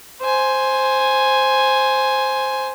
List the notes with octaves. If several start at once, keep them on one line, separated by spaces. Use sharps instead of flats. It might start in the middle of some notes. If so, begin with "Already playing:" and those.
C5 G#5